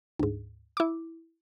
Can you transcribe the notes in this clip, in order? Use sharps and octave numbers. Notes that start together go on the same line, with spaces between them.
D2 G#2
E4 D6